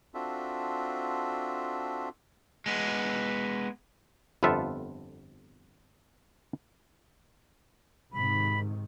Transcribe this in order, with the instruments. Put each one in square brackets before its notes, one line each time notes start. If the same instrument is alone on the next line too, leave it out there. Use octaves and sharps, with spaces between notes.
[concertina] C4 D4 F4 F#4 A4 E5
[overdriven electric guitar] G#3 B3
[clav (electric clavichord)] G1 F2 B3 F4 A4 E5
[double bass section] G#2 C3 D#3 [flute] B5